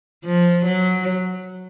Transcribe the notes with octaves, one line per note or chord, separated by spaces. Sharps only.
F3
F#3